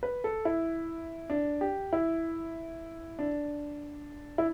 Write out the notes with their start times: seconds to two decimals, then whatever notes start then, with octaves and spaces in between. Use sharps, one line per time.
0.03 B4
0.24 A4
0.45 E4
1.30 D4
1.61 G4
1.93 E4
3.19 D4
4.38 E4